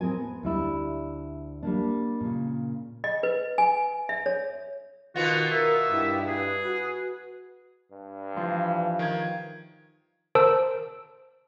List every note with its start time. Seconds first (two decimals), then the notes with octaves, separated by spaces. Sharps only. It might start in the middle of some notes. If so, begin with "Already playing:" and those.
0.01 A2 C4 G#4 A#4 G#5
0.18 B3
0.43 D2 G3 E4 D5
1.63 G3 A#3 D4
2.21 A#2 C#3
3.04 D#5
3.23 B4
3.58 G#5
4.09 E5
4.26 C#5
5.16 B2 D#3 B3 F4 F#4
5.51 A#4 E5
5.90 G2 E4 G4
6.27 G#4 B4
6.64 F#4
7.91 G2
8.37 E3 F3
8.99 D#3 G#6
10.35 A#4 C5 A5 E6 D7